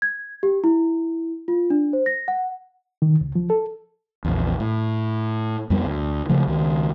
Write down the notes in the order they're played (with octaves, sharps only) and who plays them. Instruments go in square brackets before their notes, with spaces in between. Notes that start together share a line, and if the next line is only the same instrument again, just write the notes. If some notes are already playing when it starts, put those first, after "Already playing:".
[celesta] G#6
G4
E4
F4
D4
C5
A#6
F#5
[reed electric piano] D#3
C#2
F3
A4
[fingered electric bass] A#1 E2
A2
F2 G3 B3
D2
C#3 F3 A3
C#2 D#3